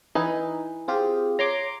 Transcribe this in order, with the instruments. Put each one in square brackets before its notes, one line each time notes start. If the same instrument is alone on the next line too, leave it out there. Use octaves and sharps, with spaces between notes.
[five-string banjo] E3 B4 G#5 [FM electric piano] D#4
[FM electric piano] C4 F4 G4 [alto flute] G#4
[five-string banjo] C#5 [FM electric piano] A#5 C6 D6